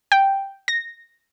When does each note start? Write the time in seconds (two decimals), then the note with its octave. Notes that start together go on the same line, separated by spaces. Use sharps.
0.12 G5
0.68 A#6